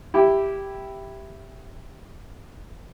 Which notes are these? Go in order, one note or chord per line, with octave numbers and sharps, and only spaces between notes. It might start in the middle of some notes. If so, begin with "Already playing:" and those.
E4 G4